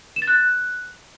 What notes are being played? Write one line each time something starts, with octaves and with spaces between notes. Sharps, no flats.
E7
A6
F#6